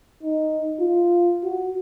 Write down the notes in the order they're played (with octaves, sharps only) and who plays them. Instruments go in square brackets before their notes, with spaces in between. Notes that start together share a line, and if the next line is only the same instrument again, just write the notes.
[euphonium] D#4
F4
F#4